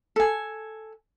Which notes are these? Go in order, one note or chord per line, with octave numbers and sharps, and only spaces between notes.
A4 G#5